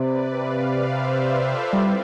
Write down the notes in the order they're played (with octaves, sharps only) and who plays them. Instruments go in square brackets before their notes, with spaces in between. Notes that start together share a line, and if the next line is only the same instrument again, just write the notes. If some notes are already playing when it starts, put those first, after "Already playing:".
Already playing: [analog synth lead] C3 [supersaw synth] B4 D5
[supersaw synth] D5 F5
C5 E5
C5 E5
F4 A4
[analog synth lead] G3 [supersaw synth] C4 E4